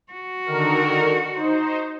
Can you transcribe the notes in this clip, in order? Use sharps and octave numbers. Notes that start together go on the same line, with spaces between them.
F#4
D3 D#3 A#4
D#4 C5